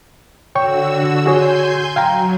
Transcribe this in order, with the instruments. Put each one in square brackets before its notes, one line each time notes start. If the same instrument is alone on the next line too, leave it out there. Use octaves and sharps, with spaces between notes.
[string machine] D3 F#4 E6 [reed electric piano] C#5 G5 C#6
[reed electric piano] F#4 G#4 C#5 [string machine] G#5 C6 G6
[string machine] F#3 [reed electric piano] F5 G5 A#5